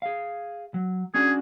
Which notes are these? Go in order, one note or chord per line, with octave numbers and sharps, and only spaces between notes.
G#4 F5
F#3
C#4 D4 F#4 G#4